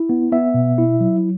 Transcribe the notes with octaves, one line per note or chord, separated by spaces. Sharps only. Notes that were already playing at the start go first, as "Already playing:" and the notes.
Already playing: E4
B3
B3 E5
B2
E4
F#3